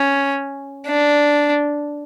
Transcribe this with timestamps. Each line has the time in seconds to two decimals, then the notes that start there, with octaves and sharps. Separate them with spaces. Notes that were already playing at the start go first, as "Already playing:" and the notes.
Already playing: C#4
0.87 D4